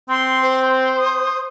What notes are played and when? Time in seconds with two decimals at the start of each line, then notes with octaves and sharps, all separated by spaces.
0.09 C4 C6
0.43 C5
0.98 D#6